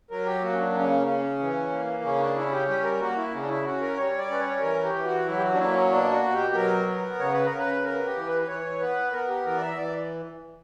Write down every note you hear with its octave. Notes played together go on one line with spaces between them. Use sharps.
F#3 A#4
G4
A#3 F#4
C#4
D4
C#3 C#4
C#4
E3
A#3
C#3 C#4
D4
C#4 E4
G4
G3 G4
A#4
A#3 F#4
E4
C#3 C#4
D4
E4
C#4 F#4
A#4
G3 C#5
D5
C#4 B4
C#5
E3 A#4
G4
E3
F#4
F#3 E4
G4
F#4
D4
A#3 E4
C#4
B2 D4
F#4
B2
G4
F#3 A#4
B3
C#3 C#5
B4
A#4
C#3
B4
B3 A#4
G4
E3
B4
B4
E3 C#5
B3 B4
B3 A#4
G4
E3 A#4
D5
E5
E3 D5